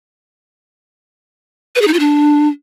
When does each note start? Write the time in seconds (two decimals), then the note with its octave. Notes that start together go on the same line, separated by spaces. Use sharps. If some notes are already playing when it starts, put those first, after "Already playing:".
1.76 B4
1.82 G#4
1.87 D#4
1.93 F4
1.99 D4